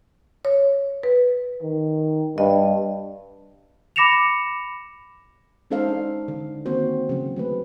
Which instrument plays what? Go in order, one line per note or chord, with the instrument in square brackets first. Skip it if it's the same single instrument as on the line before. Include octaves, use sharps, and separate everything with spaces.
[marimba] C#5
B4
[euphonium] D#3
[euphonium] G2 [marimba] D#5
[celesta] B5 D6 A#6 C#7 E7 F7
[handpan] G#3 C#4 D#4 A4 C5 F5
D4
D3
D#3 A#3 C4 F#4 C5
C#3 F#3
F#3 A3 B4